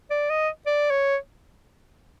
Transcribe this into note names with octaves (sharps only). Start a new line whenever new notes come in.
D5
D#5
D5
C#5